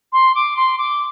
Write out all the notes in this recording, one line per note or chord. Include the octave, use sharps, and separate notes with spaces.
C6
D6
C6
D6